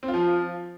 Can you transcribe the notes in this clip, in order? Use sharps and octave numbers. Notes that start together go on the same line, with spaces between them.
C4
F4
F3